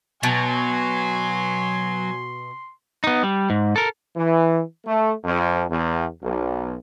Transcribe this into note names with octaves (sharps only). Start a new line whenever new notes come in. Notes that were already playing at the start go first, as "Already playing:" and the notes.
B2 F#3 G#5 C6
B3 D#4
G3
G#2
A4 A#4
E3
A3
F2
E2
B1